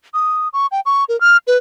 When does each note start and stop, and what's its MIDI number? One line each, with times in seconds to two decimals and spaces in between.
0.14 0.48 87
0.53 0.66 85
0.71 0.80 79
0.86 1.04 85
1.09 1.19 70
1.21 1.37 89
1.47 1.57 71